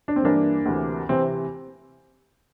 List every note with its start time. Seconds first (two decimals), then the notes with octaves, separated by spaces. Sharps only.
0.08 D4
0.16 C4
0.22 G2 E3 A#3 D4
0.65 D2 C3 E3
1.09 C3 E3 C4